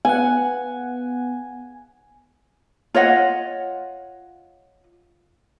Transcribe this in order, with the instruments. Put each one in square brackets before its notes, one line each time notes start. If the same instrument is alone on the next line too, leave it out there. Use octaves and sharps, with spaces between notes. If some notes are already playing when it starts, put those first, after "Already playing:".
[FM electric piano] B3 F#5 [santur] G#5
[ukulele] F4 C#5 D#5 F#5